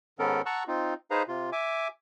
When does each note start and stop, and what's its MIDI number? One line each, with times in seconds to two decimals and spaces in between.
0.19 0.41 44
0.19 0.41 51
0.19 0.41 59
0.19 0.41 61
0.19 0.41 69
0.19 0.41 70
0.46 0.63 78
0.46 0.63 81
0.46 0.63 82
0.46 0.63 85
0.46 0.63 88
0.46 0.63 90
0.68 0.94 60
0.68 0.94 63
0.68 0.94 65
1.11 1.23 63
1.11 1.23 68
1.11 1.23 71
1.11 1.23 72
1.11 1.23 77
1.11 1.23 82
1.28 1.50 48
1.28 1.50 65
1.52 1.88 76
1.52 1.88 80
1.52 1.88 86